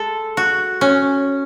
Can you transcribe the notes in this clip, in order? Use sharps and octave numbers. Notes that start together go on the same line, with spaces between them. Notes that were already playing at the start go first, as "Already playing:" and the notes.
Already playing: G#3 A4
F#4
C#4